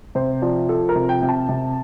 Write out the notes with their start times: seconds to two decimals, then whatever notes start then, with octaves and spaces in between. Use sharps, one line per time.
0.15 C3 C5
0.42 F3 D5
0.69 F3 A4
0.89 A#4
0.95 C3
1.09 G5
1.21 C3 G5
1.29 A5
1.49 C3